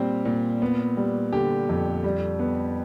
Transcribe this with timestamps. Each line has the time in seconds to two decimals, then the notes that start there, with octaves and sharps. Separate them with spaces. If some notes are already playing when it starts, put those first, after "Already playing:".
Already playing: A#2 G3 C4
0.25 A#2
0.62 B3
0.97 G3
1.33 D3 G4
1.69 F2
2.04 G3
2.39 B3